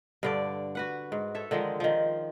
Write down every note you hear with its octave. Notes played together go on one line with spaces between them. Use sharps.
G2 D3 D5
F#4 B4 F#5
G#2
A4 C#5 E5
D3 D#3 F3 G#3
D#3 F3